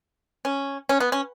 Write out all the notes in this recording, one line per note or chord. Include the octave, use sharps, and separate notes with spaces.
C#4
C#4
B3
C#4